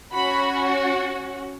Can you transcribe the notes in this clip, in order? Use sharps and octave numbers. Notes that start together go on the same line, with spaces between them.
C#4 F#4 B5